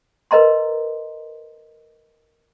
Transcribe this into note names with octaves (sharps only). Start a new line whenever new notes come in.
A#4 B4 D#5 A#5 C6